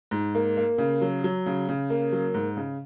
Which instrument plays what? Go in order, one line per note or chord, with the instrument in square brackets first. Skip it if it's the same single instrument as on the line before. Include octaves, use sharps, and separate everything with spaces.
[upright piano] G#2
A#3
A#3
C#3
F#3
F#3
C#3
C#3
A#3
F#3
G#2
C#3